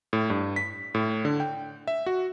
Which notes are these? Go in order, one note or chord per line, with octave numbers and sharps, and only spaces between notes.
A2
G2
B6
A2
D3
G5
E5
F#4